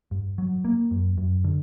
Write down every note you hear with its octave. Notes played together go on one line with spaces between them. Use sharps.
G2
F#3
A#3
F#2
F#2
D3